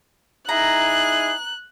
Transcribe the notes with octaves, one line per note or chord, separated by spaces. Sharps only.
D#4 E4 G#4 A#5 F#6